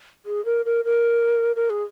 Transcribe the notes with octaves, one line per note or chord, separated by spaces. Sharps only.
G#4
A#4
A#4
A#4
A#4
G#4